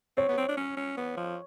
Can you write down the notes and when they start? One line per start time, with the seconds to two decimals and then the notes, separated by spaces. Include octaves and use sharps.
0.17 C4 C#5
0.29 B3
0.38 C4
0.49 D4
0.57 C#4
0.77 C#4
0.97 B3
1.17 F3